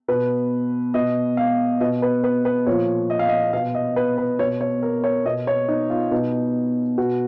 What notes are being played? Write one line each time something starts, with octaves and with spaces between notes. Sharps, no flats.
B2 B4
B2 D#5
F5
B2 D#5
B4
B4
B4
A#2 F3 C#5
D#5
F5
D#5
B2 F5
D#5
B4
B4
B2 C#5
C#5
A#4
C#5
B2 D#5
C#5
D#4
F4
B2 D#4
B2 F#4